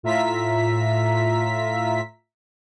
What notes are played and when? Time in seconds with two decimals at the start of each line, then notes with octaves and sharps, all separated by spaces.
0.03 A2 F4 E5 A#5 B6